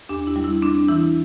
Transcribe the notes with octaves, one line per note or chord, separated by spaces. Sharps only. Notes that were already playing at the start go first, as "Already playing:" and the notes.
E2 D4 G4
E4
G3
E4
C4 D4
E3 E4